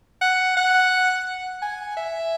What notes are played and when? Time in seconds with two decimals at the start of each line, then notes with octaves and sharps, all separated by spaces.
0.21 F#5
0.57 F#5
1.62 G#5
1.97 E5